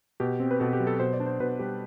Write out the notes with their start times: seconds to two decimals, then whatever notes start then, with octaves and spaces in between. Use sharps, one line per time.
0.20 B2 G4
0.40 C4
0.51 B4
0.60 B2 A4
0.73 G4
0.80 F#3
0.87 A4
1.00 B2 C5
1.13 D5
1.20 D4
1.26 C5
1.40 B2 B4
1.59 G3 G4